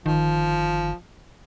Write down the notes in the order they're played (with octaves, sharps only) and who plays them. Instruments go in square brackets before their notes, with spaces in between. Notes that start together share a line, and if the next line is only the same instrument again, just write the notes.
[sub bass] G1 [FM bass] D#3 [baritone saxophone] F3